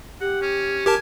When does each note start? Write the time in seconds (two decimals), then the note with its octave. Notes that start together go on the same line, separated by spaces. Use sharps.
0.21 G4 F#5
0.42 C#4
0.86 G4 A#4 G#5 A5